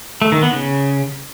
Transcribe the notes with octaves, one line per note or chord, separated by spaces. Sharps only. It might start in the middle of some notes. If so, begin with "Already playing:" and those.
A3
D#3
B3
C#3